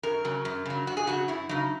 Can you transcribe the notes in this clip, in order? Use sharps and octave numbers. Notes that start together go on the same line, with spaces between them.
F#2 A#4
C#3 F#3
F#2
C#3 F#3
F#2 F#4
G#4
C#3 F#3 F#4
F#2 E4
C#3 F#3 D#4